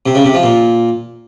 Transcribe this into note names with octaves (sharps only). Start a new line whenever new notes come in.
C3
C#3
C3
F3
A#2